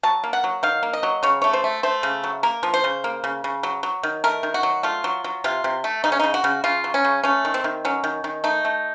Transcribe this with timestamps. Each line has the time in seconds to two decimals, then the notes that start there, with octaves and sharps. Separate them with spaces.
0.03 F#3 A5
0.24 A#3
0.33 F#5
0.44 F#3
0.63 D#3 F5
0.83 A#3
0.93 D#5
1.03 F#3
1.23 C#3 C#5
1.42 A3 C#5
1.53 C5
1.64 A3
1.83 A3 C5
2.03 C#3
2.24 F#3
2.43 A#3 A#4
2.63 F3
2.74 C5
2.84 C#3
3.04 A#3
3.24 C#3
3.44 C#3
3.63 F#3
3.83 F#3
4.03 D#3
4.24 A3 A#4
4.43 D#3
4.54 F#4
4.63 F#3
4.83 A3 F4
5.04 F#3
5.24 F#3
5.44 C3 F4
5.64 C3
5.84 A3
6.04 C#3 D#4
6.12 C#4
6.19 C#3 D#4
6.34 F#4
6.44 C#3
6.64 C#3 F4
6.84 F#3
6.94 C#4
7.04 C#3
7.23 A3 C#4
7.45 D#3
7.54 C4
7.64 D#3
7.85 F#3 C#4
8.04 D#3
8.24 D#3
8.44 A3 D#4
8.65 A3